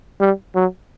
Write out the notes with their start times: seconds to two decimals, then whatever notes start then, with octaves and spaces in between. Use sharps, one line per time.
0.20 G3
0.55 F#3